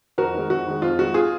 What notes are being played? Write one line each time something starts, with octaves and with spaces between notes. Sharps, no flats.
F2 F#4 A#4
D#3 G#3
F2 F#4
D#3 G#3
F2 F4
D#3 G#3 F#4
F4 G#4